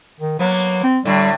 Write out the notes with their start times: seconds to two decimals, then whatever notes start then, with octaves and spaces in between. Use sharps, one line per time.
0.20 D#3
0.39 F#3 A#3 B3
0.84 C4
1.05 A2 D3 G3